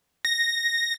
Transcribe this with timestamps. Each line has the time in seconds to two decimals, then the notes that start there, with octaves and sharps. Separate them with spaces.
0.25 A#6